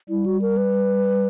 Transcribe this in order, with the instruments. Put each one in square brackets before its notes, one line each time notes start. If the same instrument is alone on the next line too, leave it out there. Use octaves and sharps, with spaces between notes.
[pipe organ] G3 [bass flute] E4
[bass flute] F#4
A#4
B4